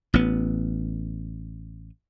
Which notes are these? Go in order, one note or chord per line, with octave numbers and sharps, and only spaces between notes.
A1 B3